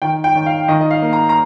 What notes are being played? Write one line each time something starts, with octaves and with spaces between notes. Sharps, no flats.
D#3 G5
G5
D#3
F5
D#3 D#5
D#5
F5
A#3
A#5
A#5